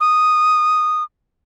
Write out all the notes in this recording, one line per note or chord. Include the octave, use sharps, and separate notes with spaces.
D#6